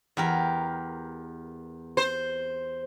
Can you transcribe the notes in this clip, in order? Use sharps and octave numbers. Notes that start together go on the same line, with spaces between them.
E2 G4 A#4
C5